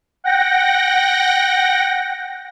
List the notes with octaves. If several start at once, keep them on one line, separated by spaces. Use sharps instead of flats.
F#5 G5 A#6